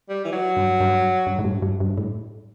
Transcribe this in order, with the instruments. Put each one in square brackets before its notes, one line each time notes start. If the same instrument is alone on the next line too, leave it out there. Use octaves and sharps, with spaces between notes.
[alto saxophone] G3
E3
F#3
[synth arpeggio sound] G2
G2
G2
A2
G2
G2
G2
A2